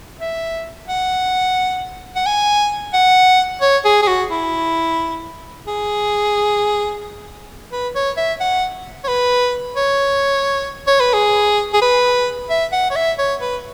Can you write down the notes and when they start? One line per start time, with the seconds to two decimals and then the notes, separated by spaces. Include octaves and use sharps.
0.20 E5
0.88 F#5
2.16 F#5
2.26 G#5
2.94 F#5
3.62 C#5
3.85 G#4
4.02 G#4
4.07 F#4
4.31 E4
5.67 G#4
7.72 B4
7.95 C#5
8.17 E5
8.40 F#5
9.04 C#5
9.08 B4
9.76 C#5
10.87 C#5
11.00 B4
11.13 G#4
11.74 G#4
11.82 B4
12.50 E5
12.72 F#5
12.90 C#5
12.96 E5
13.19 C#5
13.41 B4